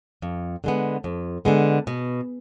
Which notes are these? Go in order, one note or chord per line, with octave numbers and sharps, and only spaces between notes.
F2
D3 G#3 B3
F2
D3 G#3 B3
B2